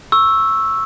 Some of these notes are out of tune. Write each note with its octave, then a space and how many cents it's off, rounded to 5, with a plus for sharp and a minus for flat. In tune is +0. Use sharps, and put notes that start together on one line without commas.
C#6 -10 E6 +0